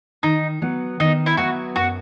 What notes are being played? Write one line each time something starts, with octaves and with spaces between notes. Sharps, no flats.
D#3 D#4
F#3 B3
D#3 D#4
E4
F#3 B3 F#4
F#2 F#4